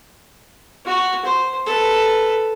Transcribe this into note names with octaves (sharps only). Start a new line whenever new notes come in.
F#4
C5
A4 B4